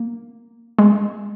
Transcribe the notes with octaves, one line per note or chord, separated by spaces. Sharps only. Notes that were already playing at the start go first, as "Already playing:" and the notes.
Already playing: A#3
G#3